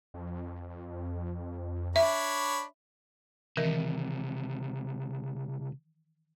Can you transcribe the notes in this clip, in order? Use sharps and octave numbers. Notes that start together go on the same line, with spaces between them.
F2
D4 C#5 E5 B5
C#2 C3 D#3 E3 A#4